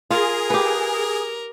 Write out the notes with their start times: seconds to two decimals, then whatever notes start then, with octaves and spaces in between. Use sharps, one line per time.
0.10 F4 G#4 A#4
0.50 G4 B4